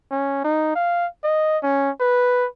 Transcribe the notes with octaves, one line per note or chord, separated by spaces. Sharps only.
C#4
D#4
F5
D#5
C#4
B4